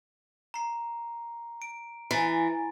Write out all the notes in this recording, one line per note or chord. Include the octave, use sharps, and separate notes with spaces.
A#5 C7
D7
E3 G#5 A#5 A6